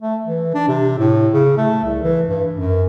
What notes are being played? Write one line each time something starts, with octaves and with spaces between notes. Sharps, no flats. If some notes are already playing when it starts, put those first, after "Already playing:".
A3
E3
D4
C3
A2
C#3
A3
C2
E3
G2
F#2